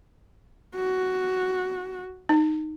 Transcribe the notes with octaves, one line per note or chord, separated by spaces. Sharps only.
F#4
D#4